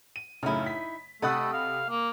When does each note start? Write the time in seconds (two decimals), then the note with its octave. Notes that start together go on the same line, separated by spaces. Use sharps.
0.16 D#7
0.43 F#2 A2 C#3 D#4 E4
0.66 B6
1.22 C3 A3 A4 D#5 F#5 B5 D#6
1.53 F5
1.90 A#3